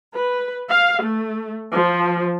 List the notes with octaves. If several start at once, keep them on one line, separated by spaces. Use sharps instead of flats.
B4
F5
A3
F3